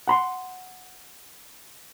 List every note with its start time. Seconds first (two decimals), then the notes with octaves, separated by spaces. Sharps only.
0.08 F#5 B5 C6